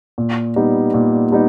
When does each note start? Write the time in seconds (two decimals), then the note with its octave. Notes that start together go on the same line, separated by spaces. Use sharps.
0.18 A#2
0.56 G3 B3 D#4
0.94 A#2
1.32 G3 B3 D#4